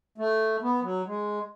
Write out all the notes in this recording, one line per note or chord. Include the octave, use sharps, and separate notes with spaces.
A3
B3
F#3
G#3